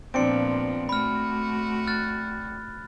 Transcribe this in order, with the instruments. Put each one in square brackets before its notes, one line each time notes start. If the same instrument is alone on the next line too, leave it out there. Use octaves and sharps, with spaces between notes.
[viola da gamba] A#2 F3 B3 [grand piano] C4 D4 [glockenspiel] C#7 D7
[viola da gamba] A3 F#4 [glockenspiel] B5 F6
[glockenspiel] F6 F#6 A6